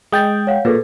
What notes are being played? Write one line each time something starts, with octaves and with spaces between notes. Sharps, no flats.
G#3 G5 D#6 A6
C#5 F5 F#5
A#2 G#4 A4 B4